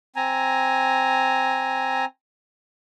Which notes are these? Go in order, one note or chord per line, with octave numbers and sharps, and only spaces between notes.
C4 G#5 A#5